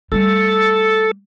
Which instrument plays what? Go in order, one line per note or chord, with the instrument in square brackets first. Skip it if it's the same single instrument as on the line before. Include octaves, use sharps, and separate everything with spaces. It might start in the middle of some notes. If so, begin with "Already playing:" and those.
[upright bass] G3 A3 [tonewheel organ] A4